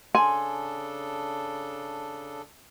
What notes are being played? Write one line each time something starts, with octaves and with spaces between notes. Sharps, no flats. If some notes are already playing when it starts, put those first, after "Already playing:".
C#3 D4 A4 G#5 C6